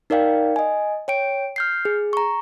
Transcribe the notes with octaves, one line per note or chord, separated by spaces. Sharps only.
D#4 A#4 D5 F5 G5
D#5 G#5
C#5 G5 D7
F6 G6 C7
G#4
A#5 C#6